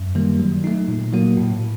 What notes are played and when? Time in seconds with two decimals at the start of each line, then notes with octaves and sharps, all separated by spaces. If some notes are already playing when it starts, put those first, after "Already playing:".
Already playing: F#2
0.15 D#3 G3 A#3
0.40 F#3
0.64 A3 D#4
0.88 A#2
1.13 F#3 A#3 F#4
1.37 A2